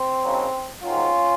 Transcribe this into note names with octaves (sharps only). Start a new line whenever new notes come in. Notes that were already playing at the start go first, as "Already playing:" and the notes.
Already playing: C4
D#2 C#3 F#3
G#2 D#3 F#3 C#4 F4